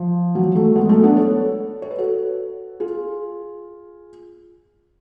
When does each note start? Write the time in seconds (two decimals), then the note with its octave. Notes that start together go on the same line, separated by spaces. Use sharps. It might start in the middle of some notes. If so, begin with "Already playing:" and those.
Already playing: F3
0.35 F#3
0.55 F#3 A3
0.76 G#3 B3
0.89 F#3 A3
1.03 B3 D4
1.17 A4 C#5
1.82 C#5
1.91 B4
1.98 F#4 A4
2.80 F4 G#4